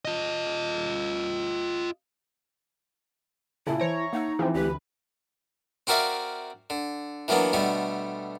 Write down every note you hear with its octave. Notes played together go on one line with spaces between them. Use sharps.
F4 D#5
A#2 C#3 E4 E5 G#5 A5
E3 C5 C#5 A#5 D7
A#3 D#4 F#5 E6
E3 F3 C4 G#4 E5 G5
D2 G4 B4
C4 F#4 A#4 D5 E5 F5
D3
E3 F#3 A#3 B3 D4
B2 D3 G3 A3